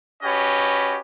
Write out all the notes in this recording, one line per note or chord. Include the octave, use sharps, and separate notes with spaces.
C#4 F#4 G4 B4 D#5